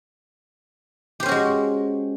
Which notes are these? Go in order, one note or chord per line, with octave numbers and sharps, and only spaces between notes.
G#3 C#4 F#4 G4 C5